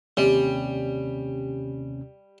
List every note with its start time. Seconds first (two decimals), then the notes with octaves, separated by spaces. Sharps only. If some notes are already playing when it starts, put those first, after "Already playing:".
0.17 D#2 C3 G3 C#4